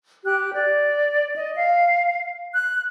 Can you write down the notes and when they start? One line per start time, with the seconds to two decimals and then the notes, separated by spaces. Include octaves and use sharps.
0.24 G4 F#6
0.54 D5
1.36 D#5
1.56 F5
2.53 F#6